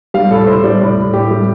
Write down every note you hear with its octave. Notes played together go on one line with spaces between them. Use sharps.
G3 F5
A2 A4
A2 C5
G3 D5
A2 D5
A2
A2 G4
G3